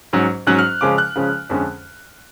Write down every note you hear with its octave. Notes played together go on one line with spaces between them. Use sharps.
G#2 F#3 C#4
G#2 F#3 C#4 F#6
F6
C#3 F3 G#3 C#4 D6
F#6
C#3 F3 G#3 C#4
F2 D3 G#3 C#4